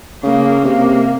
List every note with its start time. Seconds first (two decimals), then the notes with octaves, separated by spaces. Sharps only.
0.23 C#3 A#3
0.65 C3 A#3